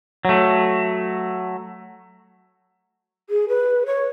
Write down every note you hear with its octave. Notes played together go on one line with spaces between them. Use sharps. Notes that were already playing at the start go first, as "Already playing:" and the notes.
F#3 A3
G#4
B4
C#5